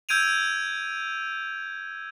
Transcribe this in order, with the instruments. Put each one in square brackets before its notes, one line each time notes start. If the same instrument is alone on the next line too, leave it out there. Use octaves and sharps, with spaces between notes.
[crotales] E6 G6 G#6 D7 D#7 F7